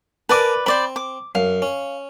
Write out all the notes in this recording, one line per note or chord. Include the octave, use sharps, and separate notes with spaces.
A#4 B4 D5 G#5 A5 D6
C4 C5 D5 B5
D6
F#2 F5
C#4